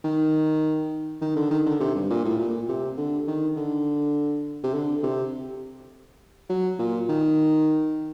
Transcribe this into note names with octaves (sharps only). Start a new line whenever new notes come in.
D#3
D#3
D3
D#3
D3
C3
G2
A#2
A2
A#2
C3
D3
D#3
D3
C3
D3
C3
F#3
A#2
D#3